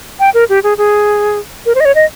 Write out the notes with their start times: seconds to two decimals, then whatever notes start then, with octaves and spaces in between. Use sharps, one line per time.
0.20 G5
0.34 A#4
0.49 G4
0.63 G#4
0.78 G#4
1.66 A#4
1.75 C5
1.80 D#5
1.85 C#5
1.95 D#5